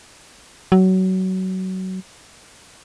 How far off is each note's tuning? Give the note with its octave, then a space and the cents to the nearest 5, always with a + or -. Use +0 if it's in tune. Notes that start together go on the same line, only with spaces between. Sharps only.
F#3 +20